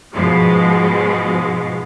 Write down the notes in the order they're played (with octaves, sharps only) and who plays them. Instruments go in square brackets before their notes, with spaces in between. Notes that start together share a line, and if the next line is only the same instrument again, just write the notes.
[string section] G#2 B2 F3 G#3